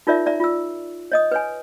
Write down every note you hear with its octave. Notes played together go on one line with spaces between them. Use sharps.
D#4 F4 A#4 C#5 D5 E5
D5 E5 A#5
F4 E6
C#5 D#5 D#6
B4 C#5 G#5